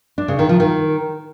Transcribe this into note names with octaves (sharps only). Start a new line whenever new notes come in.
D4
C#3
D#3
F3
D#3